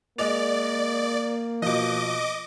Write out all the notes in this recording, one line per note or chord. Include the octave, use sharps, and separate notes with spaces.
G#3 A#3 D5 D#5 F7
B2 F3 D#5 D6